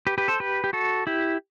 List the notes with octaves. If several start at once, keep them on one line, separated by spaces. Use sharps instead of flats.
G4 B4
G4 B4
A4 C5
G4 B4
G4
F#4 A4
E4 G4